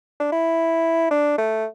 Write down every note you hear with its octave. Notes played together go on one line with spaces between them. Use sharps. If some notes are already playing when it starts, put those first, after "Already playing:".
D4
E4
D4
A3